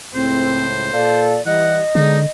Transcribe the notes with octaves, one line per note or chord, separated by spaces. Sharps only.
C#2 A2 C4 C5
A#2 A4 D5 F5
E3 G3 D#5 F#5
D3 G#3 B3 D4 D#4